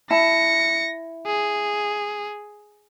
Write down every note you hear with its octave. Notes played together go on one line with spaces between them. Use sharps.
E4 A5 A#6 C#7
G#4